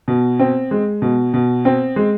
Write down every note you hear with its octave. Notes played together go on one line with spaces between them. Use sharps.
B2
C4
G#3
B2
B2
C4
G#3